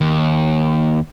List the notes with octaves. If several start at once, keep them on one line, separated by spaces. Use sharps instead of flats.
D#2